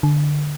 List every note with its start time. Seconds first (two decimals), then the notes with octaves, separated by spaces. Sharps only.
0.03 D3